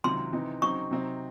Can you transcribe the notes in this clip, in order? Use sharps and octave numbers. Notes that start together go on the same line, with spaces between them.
C#2 C3 D#3 F#3 C6
C3 E3 C4 D#4
C#3 F#3 C4 D#4 C#6
C3 F#3 C4 D#4